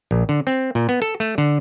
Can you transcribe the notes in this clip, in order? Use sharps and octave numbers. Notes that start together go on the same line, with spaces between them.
A#1
D3
C4
A#2
B3
A4
A3
D3